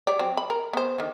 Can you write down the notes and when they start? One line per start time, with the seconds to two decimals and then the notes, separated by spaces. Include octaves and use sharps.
0.07 G4 C#5 D5
0.19 F#3 C4
0.37 B5
0.50 A#4
0.73 B3 C5
0.98 D3 D#3